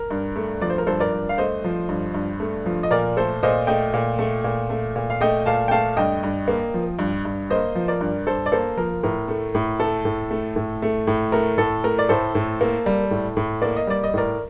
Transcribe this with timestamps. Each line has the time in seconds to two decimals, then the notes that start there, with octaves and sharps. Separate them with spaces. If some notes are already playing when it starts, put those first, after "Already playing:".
Already playing: A#4
0.11 G2
0.36 A3
0.62 F3 D5
0.70 C5
0.78 A#4
0.87 G2 A4 C5
1.00 A#4 D5
1.13 G2
1.29 F5
1.38 A3 C5 D#5
1.64 F3
1.89 G2
2.14 G2
2.40 A3
2.66 F3
2.83 D#5
2.91 A#2 A#4 D5
3.17 A3 A4 C5
3.43 A#2 C5 D#5
3.67 A3 D#5 G5
3.93 A#2
4.19 A3
4.44 A#2
4.70 A3
4.96 A#2
5.10 F5
5.21 A3 D#5 G5
5.46 A#2 F5 A5
5.68 G5
5.71 A3 F5 A5
5.97 G2 D#5 G5
6.23 G2
6.48 A#3
6.74 F3
6.99 G2
7.25 G2
7.50 A#3 C5 D#5
7.75 F3
7.88 A#4 D5
8.01 G2
8.27 G2 A4 C5
8.46 D5
8.52 A#3 A4 C5
8.77 F3 A#4
9.03 A2 A#4
9.28 A3
9.55 A2
9.80 A3 A4
10.05 A2
10.31 A3
10.56 A2
10.82 A3
11.07 A2
11.32 A3 A#4
11.58 A2 A4
11.84 A3 A#4
11.99 D5
12.09 A2 A4 C5
12.35 A2
12.61 A#3
12.86 G3
13.11 A2
13.37 A2
13.62 A#3 D5
13.76 D#5
13.87 G3 D5
14.04 D#5
14.14 A2 A#4 D5